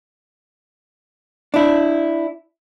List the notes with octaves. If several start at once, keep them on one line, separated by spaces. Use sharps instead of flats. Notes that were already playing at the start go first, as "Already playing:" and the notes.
D4 E4